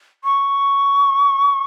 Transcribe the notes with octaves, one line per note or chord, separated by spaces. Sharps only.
C#6